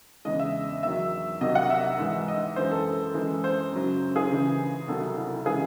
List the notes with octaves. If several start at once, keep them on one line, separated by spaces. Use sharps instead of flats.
E2 C#3 G#3 D#5
E5
E2 D#3 F#3 E5
C2 C3 D#3 F#3 D#5
F#5
E5
G#2 E3 G#3
D#5
F#2 E3 G#3 C5
A4
F#2 E3 G#3
C5
F#2 C#3 F#3
G#4
C#2 C#3 E3
C2 C3 D#3 F#3 A4
E4
C#3 E3 G#3 G#4